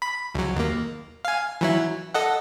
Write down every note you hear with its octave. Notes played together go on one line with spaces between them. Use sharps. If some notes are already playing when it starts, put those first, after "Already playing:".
B5
C#2 F#3
D#2 A#3
F5 G#5
E3 F#3 E4
A4 D#5 F#5